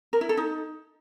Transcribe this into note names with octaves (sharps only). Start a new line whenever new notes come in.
A#4
E4
A4
D#4